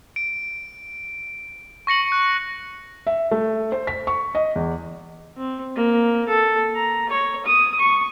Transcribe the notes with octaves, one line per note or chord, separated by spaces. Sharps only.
D7
C#6 A#6 C#7 F#7
F#6
E5
A3
C5
B6
C#6
D#5
E2
C4
A#3
A4
A#5
C#5
D#6
C#6